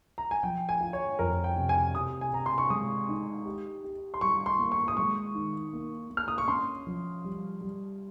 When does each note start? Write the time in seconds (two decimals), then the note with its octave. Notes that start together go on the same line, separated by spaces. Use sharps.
0.18 A#5
0.31 G#5
0.43 F3 G5
0.69 G#5
0.80 F4
0.93 C#5
1.19 F2 A#4
1.44 G5
1.56 C3
1.69 G#5
1.94 C3 D#6
2.21 G#5
2.32 C3 A#5
2.46 C6
2.58 C#6
2.70 G#3 D#6
3.08 D#4
3.45 G4
3.84 G4
4.14 C6
4.21 G3 C#6
4.46 C6
4.59 A#3
4.72 C#6
4.88 D#6
4.97 G#3 C#6
5.34 D#3
5.73 A#3
6.10 A#3
6.17 F6
6.28 D#6
6.38 C#6
6.48 C#4 C6
6.87 F3
7.24 G3
7.61 G3